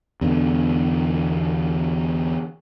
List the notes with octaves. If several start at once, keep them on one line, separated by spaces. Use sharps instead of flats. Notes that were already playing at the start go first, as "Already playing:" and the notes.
E2 B2 D3